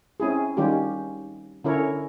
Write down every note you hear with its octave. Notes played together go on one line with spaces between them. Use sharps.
C4 C#4 E4 G#4
D#3 G3 C#4 F4 G4
D3 C#4 E4 A#4 C#5